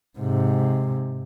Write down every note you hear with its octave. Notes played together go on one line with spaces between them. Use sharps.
G#2 C3